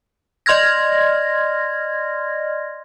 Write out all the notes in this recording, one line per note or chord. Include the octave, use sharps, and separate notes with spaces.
D5 D#5 C6 F6 G#6 A#6